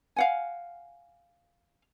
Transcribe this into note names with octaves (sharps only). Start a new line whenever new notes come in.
F5 F#5 G#5